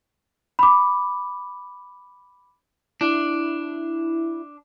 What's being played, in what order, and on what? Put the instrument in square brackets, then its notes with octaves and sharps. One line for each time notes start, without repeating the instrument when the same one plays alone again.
[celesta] B5 D6
[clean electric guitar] D4 [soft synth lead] E4